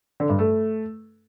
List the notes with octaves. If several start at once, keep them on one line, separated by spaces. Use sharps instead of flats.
D3
G2
A3